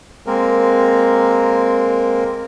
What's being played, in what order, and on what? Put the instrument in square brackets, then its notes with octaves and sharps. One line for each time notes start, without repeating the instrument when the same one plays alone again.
[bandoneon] G#3 A#3 C4 A#4